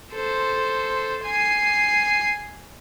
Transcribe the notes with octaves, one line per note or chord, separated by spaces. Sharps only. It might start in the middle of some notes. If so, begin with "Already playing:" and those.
A4 C5
G#5 C7